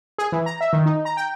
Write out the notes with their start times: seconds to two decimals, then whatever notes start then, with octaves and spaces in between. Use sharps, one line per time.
0.18 G#4
0.32 E3
0.46 A#5
0.61 E5
0.73 D#3
0.86 D#4
1.05 A#5
1.17 G5